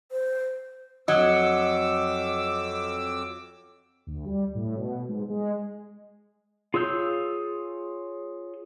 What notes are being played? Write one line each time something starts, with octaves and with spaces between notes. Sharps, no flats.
C5
F2 F#3 D#5 D6 E6
D2
G3
A2
B2
G#2
G#3
F4 G#4 C#5 E6 G6